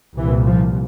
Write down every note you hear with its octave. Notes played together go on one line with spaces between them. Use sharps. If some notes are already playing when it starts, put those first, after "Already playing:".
C2 A#2 E3
F3